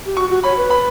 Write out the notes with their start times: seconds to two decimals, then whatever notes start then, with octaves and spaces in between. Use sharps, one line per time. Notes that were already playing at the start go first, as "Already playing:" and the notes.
0.06 G4
0.17 F#4 C#6
0.30 F#4
0.44 C#5 B5
0.57 B4
0.70 B5